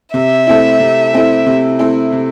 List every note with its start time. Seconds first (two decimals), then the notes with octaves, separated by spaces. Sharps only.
0.14 C3 E5
0.47 A3 C4 E4
0.80 C3
1.14 A3 C4 E4
1.46 C3
1.79 A3 C4 E4
2.12 C3